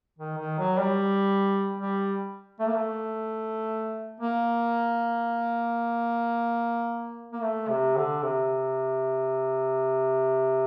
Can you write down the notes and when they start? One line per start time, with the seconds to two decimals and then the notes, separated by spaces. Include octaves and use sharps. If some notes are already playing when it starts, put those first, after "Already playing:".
0.18 D#3
0.37 D#3
0.58 F#3
0.78 G3
1.79 G3
2.59 A3
2.67 A#3
2.74 A3
4.20 A#3
7.32 A#3
7.42 A3
7.68 C3
7.95 D3
8.22 C3